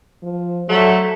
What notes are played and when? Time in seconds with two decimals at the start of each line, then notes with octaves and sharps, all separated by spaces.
0.23 F3
0.69 D3 F#3 A3